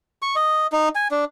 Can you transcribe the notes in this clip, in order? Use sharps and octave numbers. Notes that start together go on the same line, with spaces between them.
C#6
D#5
D#4
G#5
D4